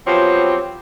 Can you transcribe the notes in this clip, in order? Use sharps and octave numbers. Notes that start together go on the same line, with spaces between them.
F3 F#3 B3 C4 G4 C#5